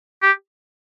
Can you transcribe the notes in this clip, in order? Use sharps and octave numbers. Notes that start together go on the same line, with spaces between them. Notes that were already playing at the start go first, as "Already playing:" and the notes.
G4